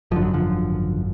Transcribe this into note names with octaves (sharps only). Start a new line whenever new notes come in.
G#1 F#2 D3 F3
F#3
D3 F3